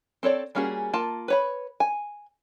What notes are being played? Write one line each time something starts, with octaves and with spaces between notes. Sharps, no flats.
C4 A4 C#5 D5
G3 A#3 C#4 F#4 G#4
A#3 F4 A5
B4 C#5 B5
G#5